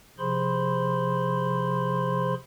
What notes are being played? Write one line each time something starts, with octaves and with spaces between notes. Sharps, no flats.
C3 F3 G#4 C5 B5 C6